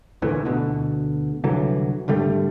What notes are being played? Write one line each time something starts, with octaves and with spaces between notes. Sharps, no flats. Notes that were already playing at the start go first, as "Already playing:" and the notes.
D2 A#2 E3 A3
D2 B2 D3
C2 D3 E3 F#3
G#1 D3 G3 A3